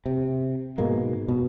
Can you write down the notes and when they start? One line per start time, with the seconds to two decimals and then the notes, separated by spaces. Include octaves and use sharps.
0.06 C3
0.78 G#2 B2 G#3 A#3
1.28 B2